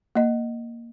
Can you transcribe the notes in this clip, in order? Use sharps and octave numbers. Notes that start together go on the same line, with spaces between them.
A#3 D#5